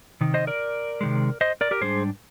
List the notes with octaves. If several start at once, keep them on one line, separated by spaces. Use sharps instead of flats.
C3 D#3
C5 D#5
A#4 D5
C3 D#3 G#3
C5 D#5
A#4 D5
G4 A#4
G#2 G3 D4 G#4 C5